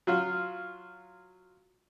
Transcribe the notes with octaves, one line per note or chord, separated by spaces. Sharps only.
F#3 F4